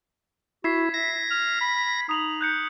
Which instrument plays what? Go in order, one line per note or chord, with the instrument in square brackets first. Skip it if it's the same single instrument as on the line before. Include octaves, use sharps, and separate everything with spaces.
[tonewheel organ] E4 [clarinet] F#4 [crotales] G#6 B6 C7
[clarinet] E5 [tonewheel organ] A#6
[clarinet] F6
B5
[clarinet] D#4 [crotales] D#6 F7 F#7
[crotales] F#6 G6 C#7